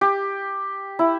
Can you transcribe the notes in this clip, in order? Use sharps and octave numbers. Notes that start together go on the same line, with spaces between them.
G4
E4